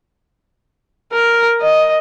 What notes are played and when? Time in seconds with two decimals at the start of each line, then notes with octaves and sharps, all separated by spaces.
1.12 A#4
1.60 D#5